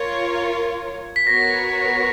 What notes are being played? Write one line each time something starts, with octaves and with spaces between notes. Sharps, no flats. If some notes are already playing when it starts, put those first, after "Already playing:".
Already playing: F4 A#4 C#5 G#6
B6
B3 F#4 A#4 C#5 A#6